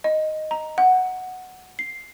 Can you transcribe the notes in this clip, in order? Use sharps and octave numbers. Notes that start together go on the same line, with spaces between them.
D#5
A#5
F#5
C7